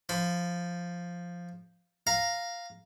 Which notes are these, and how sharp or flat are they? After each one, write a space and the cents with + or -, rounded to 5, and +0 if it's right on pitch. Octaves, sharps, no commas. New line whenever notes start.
F3 +0 B5 +35
F5 +0 A#5 +0